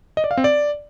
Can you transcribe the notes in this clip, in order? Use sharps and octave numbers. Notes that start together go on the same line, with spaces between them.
D#5
D5
F5
C4
D5